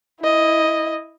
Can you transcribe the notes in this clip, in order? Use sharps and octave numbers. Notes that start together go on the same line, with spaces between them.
E4 D#5